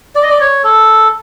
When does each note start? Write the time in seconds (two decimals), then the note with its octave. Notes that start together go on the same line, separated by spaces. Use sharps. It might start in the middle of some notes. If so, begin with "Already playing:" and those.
0.15 D5
0.22 D#5
0.29 D5
0.40 C#5
0.64 A4